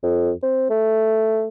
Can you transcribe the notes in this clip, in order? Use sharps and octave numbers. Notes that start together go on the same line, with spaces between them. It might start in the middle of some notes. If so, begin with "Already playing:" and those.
F2
C4
A3